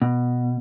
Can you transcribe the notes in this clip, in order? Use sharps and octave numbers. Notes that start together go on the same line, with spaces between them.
B2